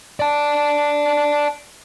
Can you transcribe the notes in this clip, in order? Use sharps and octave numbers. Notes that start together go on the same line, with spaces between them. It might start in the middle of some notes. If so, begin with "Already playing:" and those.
D5 A5